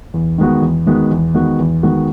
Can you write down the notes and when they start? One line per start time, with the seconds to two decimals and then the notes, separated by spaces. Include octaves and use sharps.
0.14 E2
0.38 D#3 G#3 B3 F#4
0.62 E2
0.86 D#3 G#3 B3 F#4
1.11 E2
1.34 D#3 G#3 B3 F#4
1.59 E2
1.83 D#3 G#3 B3 F#4